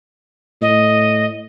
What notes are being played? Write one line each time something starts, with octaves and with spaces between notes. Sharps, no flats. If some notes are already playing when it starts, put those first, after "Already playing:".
A2 D#5